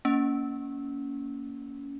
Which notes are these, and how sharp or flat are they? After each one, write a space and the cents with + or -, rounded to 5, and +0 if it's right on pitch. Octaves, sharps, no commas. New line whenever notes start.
A#3 +0 C#4 +20